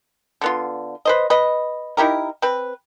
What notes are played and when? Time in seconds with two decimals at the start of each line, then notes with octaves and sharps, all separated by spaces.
0.41 D3 B3 F4
1.05 B4 C5 D#5
1.30 B4 D#5
1.97 D#4 E4 G4 A#4
2.42 C4 B4